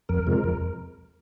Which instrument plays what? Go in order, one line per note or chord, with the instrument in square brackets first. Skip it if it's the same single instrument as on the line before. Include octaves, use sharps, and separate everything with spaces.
[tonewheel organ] F2 A#4
C3 F3 G#3
F2